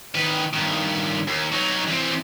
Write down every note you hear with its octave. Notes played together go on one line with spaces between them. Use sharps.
D#3 B4
G2 D#3
D#2
F#3 D#4
E3 C4